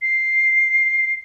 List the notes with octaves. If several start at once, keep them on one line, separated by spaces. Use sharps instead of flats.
C7